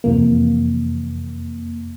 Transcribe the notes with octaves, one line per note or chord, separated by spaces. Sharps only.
F2 C3 E3 A#3